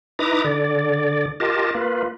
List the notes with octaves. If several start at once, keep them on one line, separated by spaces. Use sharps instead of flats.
D#4 E4 B4 A#5 D6 D#6
D3 D5
F4 G4 A#4 D#5 A5
A#3 F4 B4